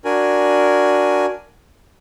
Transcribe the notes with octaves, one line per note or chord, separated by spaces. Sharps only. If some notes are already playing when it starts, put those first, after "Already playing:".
D4 F#4 A#4 G#5